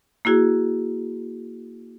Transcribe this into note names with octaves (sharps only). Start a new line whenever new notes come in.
A#3 E4 F#4 G#4